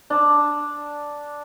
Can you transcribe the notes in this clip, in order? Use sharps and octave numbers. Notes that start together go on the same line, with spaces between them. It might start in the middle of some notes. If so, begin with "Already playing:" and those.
D4